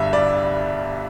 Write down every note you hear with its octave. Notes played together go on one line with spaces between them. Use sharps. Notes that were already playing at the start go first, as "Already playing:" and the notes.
Already playing: G1 G2 D3 G3 E5
D5